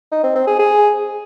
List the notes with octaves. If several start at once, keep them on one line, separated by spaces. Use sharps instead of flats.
D#4
C4
C4
G#4
G#4